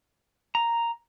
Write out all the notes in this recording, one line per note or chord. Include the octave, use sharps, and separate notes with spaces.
A#5